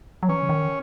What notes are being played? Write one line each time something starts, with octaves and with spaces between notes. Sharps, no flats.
F#3
E3 C#4
C#3
D#3